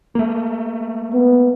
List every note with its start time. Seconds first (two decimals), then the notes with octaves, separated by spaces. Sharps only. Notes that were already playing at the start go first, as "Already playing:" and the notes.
0.15 A3 A#3
1.13 B3